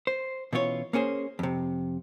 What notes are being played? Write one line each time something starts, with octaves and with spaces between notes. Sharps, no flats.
C5
B2 E3 C#4 F4 C#5
A#3 C#4 G#4 C5
F2 C3